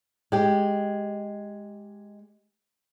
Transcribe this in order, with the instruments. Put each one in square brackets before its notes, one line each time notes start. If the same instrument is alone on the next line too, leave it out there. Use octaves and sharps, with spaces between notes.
[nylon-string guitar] G#3 G4